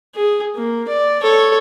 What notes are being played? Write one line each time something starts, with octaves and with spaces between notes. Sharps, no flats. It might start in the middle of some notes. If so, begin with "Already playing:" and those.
G#4
A#3
D5
A4 C#5